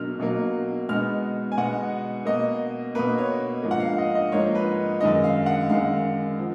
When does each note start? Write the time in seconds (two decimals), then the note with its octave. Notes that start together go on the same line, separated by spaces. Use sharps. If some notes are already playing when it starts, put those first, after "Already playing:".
Already playing: B2 F#3 A#3 F6
0.19 B2 F#3 A#3
0.89 B2 G#3 B3 F6
1.52 G#5
1.58 B2 G#3 B3 F#5
2.25 B2 A#3 D#5
2.95 B2 A#3 B4
3.18 C#5
3.63 G#2 F3 A#3
3.71 F#5
3.80 F5
3.98 D#5
4.15 D#5
4.32 G#2 F3 A#3 C#5
4.55 B4
5.01 F#2 D#3 G#3 D#5
5.24 F5
5.46 F#5
5.69 F#2 D#3 G#3 F5
6.38 F3